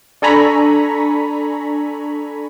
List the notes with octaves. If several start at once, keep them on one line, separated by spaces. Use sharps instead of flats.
D4 A4 G#5 A#5 B5 C#6